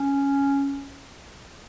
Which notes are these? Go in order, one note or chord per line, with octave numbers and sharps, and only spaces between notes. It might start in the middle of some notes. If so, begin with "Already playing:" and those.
Already playing: C#4